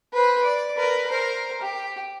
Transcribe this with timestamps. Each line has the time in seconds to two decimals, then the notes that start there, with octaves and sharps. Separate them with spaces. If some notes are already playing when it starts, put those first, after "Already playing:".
0.13 B4 C5
0.43 D5
0.77 A#4 B4
1.10 A#4 C5
1.61 G4